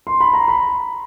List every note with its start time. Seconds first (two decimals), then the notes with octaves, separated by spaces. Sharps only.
0.07 C6
0.20 B5
0.33 A#5
0.48 B5